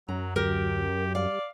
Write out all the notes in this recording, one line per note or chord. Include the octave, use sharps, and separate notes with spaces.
F#2 F#3 A#5
D2 F#3 G4 A#4
G3 D5 F5